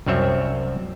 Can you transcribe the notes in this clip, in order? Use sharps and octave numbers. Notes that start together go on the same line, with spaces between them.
C2 F#2 C4 C#5 E5